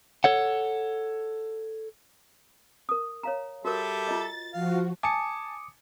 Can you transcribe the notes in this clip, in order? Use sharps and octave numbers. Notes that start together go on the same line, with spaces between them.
A4 C#5 F#5
A#4 D#6
C#5 F5 A#5
G3 F#4 A4 A#4 E5
F4 D#5 A6
F3 F#4 F5
G#5 A5 D6 D#6 C#7